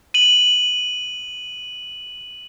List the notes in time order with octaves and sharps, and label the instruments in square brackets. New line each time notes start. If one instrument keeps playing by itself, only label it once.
[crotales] D#7 F#7